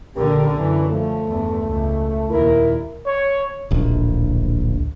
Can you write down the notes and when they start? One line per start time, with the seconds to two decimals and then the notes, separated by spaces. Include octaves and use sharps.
0.16 A#1 D3 F#4 G4 A#4
0.56 F#2 E3
0.89 F3 A3
1.28 E2 G2
1.64 C#2
2.30 D#2 A#2 E4 A#4
3.06 C#5
3.71 D1 A#1